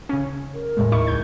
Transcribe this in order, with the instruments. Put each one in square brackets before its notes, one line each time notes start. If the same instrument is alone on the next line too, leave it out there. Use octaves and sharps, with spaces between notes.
[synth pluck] C#3 C#4
[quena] A#4
[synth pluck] D#2 A2 G#3
D#4 E4 C#6
C#2 G6 G#6